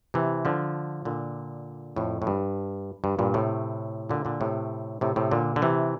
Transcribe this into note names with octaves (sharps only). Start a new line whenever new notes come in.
C3 E3
D3 F3
A#2 D3
F2 A2
A2
G2
G2
G2 A#2
A2 C3
A#2 D3
A#2 D3
A2 C3
A2 C3
A2 C3
A#2 D3
D3
C3 E3